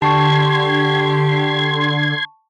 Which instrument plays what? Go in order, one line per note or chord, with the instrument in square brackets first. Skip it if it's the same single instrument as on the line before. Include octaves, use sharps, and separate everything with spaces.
[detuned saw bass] D3 [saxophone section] G4 [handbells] A5 C#6 [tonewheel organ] C6 G#6